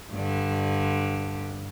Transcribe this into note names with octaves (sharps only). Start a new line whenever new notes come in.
G2 D3